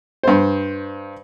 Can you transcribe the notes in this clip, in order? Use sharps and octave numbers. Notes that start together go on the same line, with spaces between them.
G2 C5